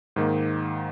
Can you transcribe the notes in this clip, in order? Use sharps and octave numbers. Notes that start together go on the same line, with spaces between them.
G#2 D#3 A#3